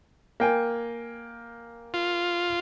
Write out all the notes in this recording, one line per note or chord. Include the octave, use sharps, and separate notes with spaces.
A#3 G5 G#5
F4